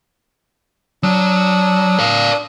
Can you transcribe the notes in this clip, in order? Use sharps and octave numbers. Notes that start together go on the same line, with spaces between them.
F#3 D4 D#6 E6
D5 F5